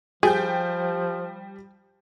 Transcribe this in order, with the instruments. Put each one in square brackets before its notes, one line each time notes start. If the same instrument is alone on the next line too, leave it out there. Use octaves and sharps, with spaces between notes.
[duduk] F3 [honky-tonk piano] G3 G5 G6 [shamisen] G#4